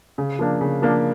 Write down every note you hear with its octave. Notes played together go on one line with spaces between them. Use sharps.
C#3
F3 A#3 D4
C#3
F3 A#3 D4